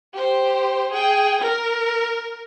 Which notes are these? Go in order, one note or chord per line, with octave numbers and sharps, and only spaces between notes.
G4 C5
G#4 G5
A#4